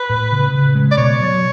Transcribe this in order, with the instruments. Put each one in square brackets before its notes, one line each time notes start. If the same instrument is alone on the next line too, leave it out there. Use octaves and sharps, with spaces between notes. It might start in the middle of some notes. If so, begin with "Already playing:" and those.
Already playing: [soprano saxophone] B4
[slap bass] A2
C#3
C#3
G#3
[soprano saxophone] D5
[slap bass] B2 [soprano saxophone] C#5
[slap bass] F#3